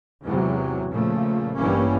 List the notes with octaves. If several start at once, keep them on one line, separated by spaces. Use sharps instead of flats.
E2 G#2 C3 E3 F#3
A#2 C#3 F3 A3
A1 G2 E3 G3 A#3 C#4